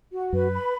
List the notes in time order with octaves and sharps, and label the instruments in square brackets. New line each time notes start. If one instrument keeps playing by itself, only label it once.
[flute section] F#4
[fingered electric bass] F#2 [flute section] B4
[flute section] B5